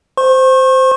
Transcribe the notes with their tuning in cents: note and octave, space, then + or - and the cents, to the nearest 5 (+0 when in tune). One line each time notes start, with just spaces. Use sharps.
C5 -10 C#6 -40